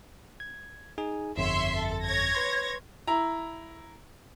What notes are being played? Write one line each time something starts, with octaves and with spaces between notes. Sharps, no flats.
G#6
D#4 G#4 G#5
G1 F2 C#5 E5 C6
A4
C#5 G#6 A#6
B4 C6
E4 A#5